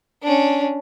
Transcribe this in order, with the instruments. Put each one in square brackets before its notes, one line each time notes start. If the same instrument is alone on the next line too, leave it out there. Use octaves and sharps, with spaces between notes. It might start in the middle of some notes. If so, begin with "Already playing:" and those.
[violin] C#4 D4